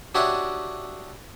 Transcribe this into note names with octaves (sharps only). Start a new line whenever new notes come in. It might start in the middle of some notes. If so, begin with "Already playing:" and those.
D4 F#4 G4 C#5 D#5 E5